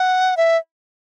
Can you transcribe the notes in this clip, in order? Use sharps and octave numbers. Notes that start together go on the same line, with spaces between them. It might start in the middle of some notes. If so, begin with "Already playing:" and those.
Already playing: F#5
E5